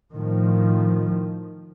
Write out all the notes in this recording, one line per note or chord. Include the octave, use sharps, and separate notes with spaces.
A2 D#3 F3